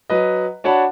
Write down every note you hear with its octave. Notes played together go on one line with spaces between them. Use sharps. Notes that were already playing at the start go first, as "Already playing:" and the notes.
F#3 B4 D#5
D4 F#4 C#5 F#5 A5 B5